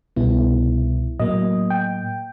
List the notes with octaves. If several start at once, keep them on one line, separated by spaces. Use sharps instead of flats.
C2 B2 G3 B3 E4
A2 F#3 A#3 D#5
G5